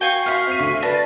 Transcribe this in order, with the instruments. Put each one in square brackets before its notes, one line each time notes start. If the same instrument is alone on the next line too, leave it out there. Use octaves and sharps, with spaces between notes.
[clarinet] F#4 [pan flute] F5 [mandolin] G5 G#5 C#6
[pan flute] E5 [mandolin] F5 C6 [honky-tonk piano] F6
[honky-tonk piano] C4 C7 D#7
D2 D3 C#6
[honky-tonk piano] B4 A#6 [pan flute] D5 [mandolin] A5